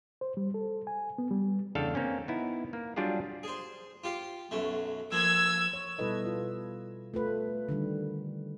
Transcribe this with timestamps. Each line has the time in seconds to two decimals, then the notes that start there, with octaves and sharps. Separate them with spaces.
0.21 C5
0.37 G3
0.54 A4
0.87 G#5
1.18 B3
1.31 G3
1.75 E2 C#3 D4 A4 F5 G5
1.95 A#3 C4 C#4
2.28 B3 D#4 E4
2.73 A#3
2.96 F#3 G3 D4 F4 G4 G#4
3.43 G#4 C5
4.04 F4 G4 F5
4.51 B1 F#2 A3
5.12 F3 A#3 E6 G#6
5.73 C#5
5.99 B2 G3 E4 A4 B4 D#5
6.25 F4
7.14 A3 F4 B4
7.69 D3 D#3 G3